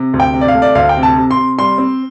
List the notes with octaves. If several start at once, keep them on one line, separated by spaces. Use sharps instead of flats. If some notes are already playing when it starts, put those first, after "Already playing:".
Already playing: C3
D2
G5
C3
D5
F5
A3
D5
D2 F5
G5
C3
A5
C3
C6
C3
G3 C6
C4